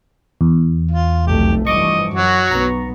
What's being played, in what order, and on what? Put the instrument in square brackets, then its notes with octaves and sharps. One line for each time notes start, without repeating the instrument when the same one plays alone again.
[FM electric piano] E2
[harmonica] F4
[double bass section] F1 B1 A3 [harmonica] G4
[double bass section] G2 E3 F3 [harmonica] D#5 [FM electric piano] C#6 D6
[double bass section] F#2 [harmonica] F#3 F#4
[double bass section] B1 B3 [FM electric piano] A#5 C#6